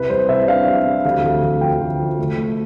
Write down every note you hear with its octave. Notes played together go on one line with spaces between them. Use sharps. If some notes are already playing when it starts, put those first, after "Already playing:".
Already playing: C2 B4
G3 C5
C2 E5
D4 F5
G3
C2
D2 F5
D2
D2
F3 G5
D2
F3
A3
A3